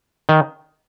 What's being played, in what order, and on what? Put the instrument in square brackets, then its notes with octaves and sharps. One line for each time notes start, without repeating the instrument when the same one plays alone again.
[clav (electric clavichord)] D#3